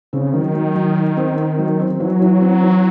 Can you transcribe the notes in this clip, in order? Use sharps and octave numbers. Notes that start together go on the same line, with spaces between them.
C#3 C4
D#3 F#3
F#3
F#3
D#4
C4
C4
F#3
C4
E3 F#3
E3
C4
E3